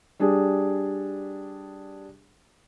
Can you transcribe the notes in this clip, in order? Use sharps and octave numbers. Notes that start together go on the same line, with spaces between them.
G3 D4 G#4